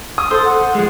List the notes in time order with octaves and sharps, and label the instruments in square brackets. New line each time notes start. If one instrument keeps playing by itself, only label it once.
[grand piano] D#6
[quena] A4 [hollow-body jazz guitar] C5
[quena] F#5
[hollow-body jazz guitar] F3 G#3